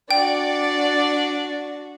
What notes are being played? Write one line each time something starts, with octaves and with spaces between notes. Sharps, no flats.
D4 F#4 D5 G5